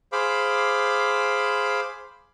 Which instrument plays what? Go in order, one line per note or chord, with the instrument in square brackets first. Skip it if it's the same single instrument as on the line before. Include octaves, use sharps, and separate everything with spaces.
[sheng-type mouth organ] G#4 C5 F5 B5 D6